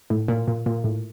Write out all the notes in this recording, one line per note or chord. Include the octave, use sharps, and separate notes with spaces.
A2
A#2
A#2
A#2
A2